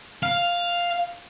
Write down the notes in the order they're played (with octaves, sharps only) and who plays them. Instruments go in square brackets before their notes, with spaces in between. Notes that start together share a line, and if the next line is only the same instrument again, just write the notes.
[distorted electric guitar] F5